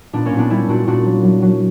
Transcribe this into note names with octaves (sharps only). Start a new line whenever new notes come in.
A#2 B3 D4
A#3 C#4
A#2
B3 D4
G3 C#4 E4
A#2 D4 F#4
A#2 D4 F#4
F#3
F#3
F#3